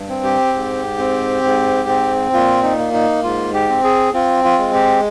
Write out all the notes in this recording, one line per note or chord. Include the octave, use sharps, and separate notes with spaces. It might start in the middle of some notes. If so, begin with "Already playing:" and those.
Already playing: G2
C4
G4
G#2
C4
G#2
C4
A#2 F4
D#4
A#3
D#4
G#2 F4
G4
C4
G#4
C4 F4
F4
G#3
G4